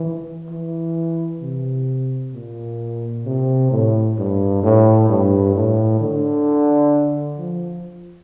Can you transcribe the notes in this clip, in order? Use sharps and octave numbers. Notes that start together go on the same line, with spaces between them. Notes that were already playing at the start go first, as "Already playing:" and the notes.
Already playing: E3
E3
C3
A#2
C3
A2
G2
A2
G2
A2
D3
F3